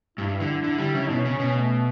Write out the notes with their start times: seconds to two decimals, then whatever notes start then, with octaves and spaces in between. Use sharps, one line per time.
0.18 G2 E4
0.40 D3
0.64 D3
0.78 G3
0.95 C#3
1.10 B2 C#4
1.25 C#3
1.39 B2
1.56 A3